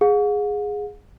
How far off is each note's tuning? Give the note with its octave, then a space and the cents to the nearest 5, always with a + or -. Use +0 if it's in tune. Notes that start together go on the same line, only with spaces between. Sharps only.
G#4 -5 F#5 -45